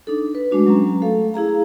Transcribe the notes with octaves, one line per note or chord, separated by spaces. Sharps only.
D4 D#4 A4
B4
G#3 A3 D4 F#4
F#3 C#4 A#5
A3 A4 F5
E4 G#4 F5 A#5